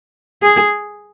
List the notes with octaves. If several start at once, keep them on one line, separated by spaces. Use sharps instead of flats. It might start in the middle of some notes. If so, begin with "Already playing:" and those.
G#4